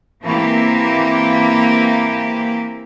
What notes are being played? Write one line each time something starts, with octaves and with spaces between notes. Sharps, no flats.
E3 A#3 C4 G4 E5